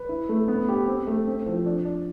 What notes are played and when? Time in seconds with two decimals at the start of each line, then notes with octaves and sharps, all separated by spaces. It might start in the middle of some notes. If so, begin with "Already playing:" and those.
Already playing: B4
0.09 E4
0.29 A3
0.48 B3
0.68 G4
0.87 C4
1.07 A3
1.27 C4
1.46 F3
1.66 D4
1.85 D4